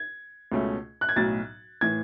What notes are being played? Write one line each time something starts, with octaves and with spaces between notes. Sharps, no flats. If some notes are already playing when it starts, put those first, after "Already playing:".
Already playing: G#6
C#2 B2 A3 C#4
F#6
G#6
B1 A2 F#3 A6
A2 E3 G#6